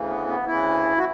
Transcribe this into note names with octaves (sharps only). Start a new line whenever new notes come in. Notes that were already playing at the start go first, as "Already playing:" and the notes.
Already playing: D2 C#3 E3
B3
B3
D2 C#3 E3 E4
F#4